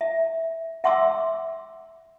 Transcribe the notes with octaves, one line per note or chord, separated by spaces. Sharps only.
E5
E5 F#5 C6 D6 E6